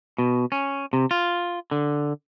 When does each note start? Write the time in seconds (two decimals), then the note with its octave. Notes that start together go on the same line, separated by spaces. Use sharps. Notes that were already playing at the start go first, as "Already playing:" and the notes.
0.18 B2
0.52 C#4
0.93 C3
1.11 F4
1.71 D3